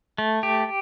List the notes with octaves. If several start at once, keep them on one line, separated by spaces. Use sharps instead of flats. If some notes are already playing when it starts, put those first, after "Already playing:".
A3
G4